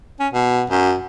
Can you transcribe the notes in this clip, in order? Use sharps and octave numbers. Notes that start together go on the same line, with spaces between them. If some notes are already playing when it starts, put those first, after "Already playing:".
C#4
B2
F#2